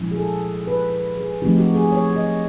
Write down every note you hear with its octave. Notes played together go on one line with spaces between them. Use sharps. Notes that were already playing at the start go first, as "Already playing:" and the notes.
Already playing: A#2 F3 G#3 C#4 E4
G#4
A4
B4
G#4
F3 A3 C4 D#4 G4
F#4
G#4
C#5
D#5